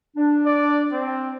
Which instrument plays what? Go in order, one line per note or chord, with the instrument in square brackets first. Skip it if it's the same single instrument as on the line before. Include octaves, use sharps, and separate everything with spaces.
[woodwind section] D4
[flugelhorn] D5
C4